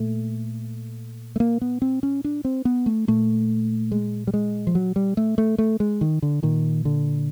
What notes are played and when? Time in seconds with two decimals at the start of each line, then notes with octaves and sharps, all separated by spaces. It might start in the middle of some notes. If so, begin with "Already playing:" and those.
Already playing: A#2 A3
1.36 A3
1.40 A#3
1.61 B3
1.82 C4
2.03 C#4
2.24 D4
2.45 C4
2.65 B3
2.86 A3
3.08 A#2 A3
3.92 G#3
4.27 G3
4.34 G#3
4.67 F3
4.75 F#3
4.96 G3
5.17 A3
5.38 A3
5.58 A3
5.80 G#3
6.01 D#3
6.22 D3
6.43 A#2 D#3
6.85 D3